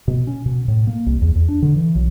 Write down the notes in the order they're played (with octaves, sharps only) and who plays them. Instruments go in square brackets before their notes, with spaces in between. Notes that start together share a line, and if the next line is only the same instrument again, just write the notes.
[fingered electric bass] B2
C#4
B2
A2
A#3
C2
E2
E2
D4
D3
E3
B1